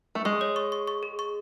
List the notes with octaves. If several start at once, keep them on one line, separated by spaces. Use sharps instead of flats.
A3
G#3 C#6
C#5
C#6
C#6
C#6
G#4
C#6